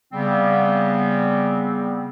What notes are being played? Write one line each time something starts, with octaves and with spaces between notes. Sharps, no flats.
C#3 G3 B3 C4